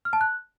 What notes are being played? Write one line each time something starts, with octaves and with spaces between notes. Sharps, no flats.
F6
A5
F#6